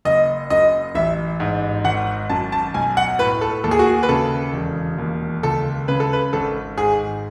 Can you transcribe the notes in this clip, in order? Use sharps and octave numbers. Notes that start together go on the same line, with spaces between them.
F#1 D#5
F#2 D#5
A1 E5
G#2
G#1 F#5
F#2 A5
A5
B1 G#5
F#5
A2 B4
A4
D#2 A4
G#4
F#4
G#4
B4
C#3 A4
E1
D#2
C#2 A4
C#3 B4
A4
B4
G#1 A4
G#2 G#4